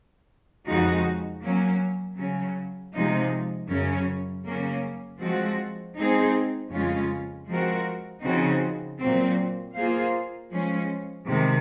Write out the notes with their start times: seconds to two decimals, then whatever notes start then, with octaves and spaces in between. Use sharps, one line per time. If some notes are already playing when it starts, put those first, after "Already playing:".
0.67 F2 C#3 G#3 D#4 F#4
1.42 F#3 A#3 C#4
2.18 C#3 F#3 C#4
2.94 C3 F3 G#3 D#4
3.69 F#2 C#3 F#3 C#4
4.45 C#3 F#3 A#3 C#4
5.21 F3 G#3 C4 F#4
5.96 G#3 C4 D#4 G#4
6.72 F2 C#3 G#3 C#4 F4
7.47 F3 G#3 C4 F#4 A#4
8.23 C#3 F3 C4 D#4 F#4
8.99 A#2 F#3 C4
9.75 A#3 F4 G#4 C5 F5
10.50 F3 G#3 C#4
11.25 C3 D#3 G#3